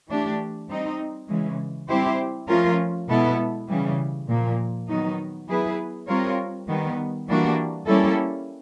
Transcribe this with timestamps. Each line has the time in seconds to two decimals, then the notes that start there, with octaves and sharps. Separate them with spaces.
0.08 E3 A3 D4 G4
0.68 G3 C4 D#4
1.27 C#3 E3 G#3
1.88 G3 C4 E4 G4 C5
2.47 F3 A3 C#4 F4 A#4
3.08 B2 G#3 B3 E4 A4
3.68 C#3 E3 G3
4.28 A#2 F3 A#3
4.88 D#3 F#3 B3 D#4
5.48 F#3 B3 E4 G#4 B4
6.07 G3 C4 F4 A#4 C#5
6.68 D#3 G3 B3
7.27 E3 G3 A#3 D4 F#4
7.87 G3 A#3 C#4 E4 A4